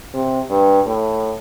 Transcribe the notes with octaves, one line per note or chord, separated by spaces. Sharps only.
C3
G2
A2